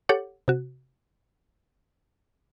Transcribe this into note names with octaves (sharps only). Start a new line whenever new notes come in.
G4 A4 C#5 F#5 D6
C3 F#4